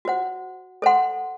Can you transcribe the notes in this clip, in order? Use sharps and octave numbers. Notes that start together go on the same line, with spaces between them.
F#4 C5 F#5
A4 C5 F#5 C6